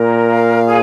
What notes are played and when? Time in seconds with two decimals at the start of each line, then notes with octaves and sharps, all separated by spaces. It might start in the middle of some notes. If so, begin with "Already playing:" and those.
Already playing: A#2 A#4
0.29 F5
0.66 G#4